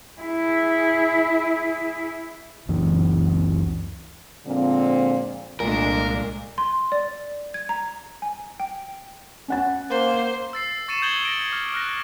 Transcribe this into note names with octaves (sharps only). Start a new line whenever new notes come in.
E4 G#4
F#1 C#2 F#2 E3
A#2 D3 F3 G#3 C4
C2 A#2 G#3 A3 D4 A#4
C6
D5
G#6
A#5
G#5
G5
C#4 F#5 A6
A#3 C5
E6 A6 C7
C#6 A6 C#7 D#7 E7
D#6 G6 G#6 F#7 G7
A#6 D7
D6 F6
F6 F#6 A#6